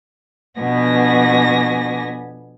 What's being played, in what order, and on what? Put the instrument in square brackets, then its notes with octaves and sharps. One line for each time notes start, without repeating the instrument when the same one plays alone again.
[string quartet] F2 B2 B3 D4 G#5 A#6